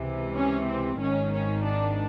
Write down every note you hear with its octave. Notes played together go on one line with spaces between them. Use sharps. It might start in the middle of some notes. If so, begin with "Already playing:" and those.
Already playing: C#2 C3 E3
C#4
C4
G#1 G#2 D#3 C#4
C#4
D4